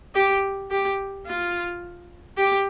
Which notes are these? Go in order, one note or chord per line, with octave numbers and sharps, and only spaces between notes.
G4
G4
F4
G4